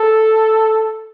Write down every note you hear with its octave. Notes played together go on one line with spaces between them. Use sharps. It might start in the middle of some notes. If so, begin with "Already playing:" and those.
Already playing: A4